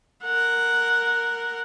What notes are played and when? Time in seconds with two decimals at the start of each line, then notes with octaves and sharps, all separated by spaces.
0.25 A#4 F#5